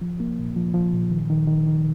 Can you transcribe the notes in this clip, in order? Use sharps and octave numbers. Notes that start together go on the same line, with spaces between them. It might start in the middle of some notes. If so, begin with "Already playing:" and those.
F3
A#3
A#2
F3
F3
A#2
D#3
D#3
D#3
D#3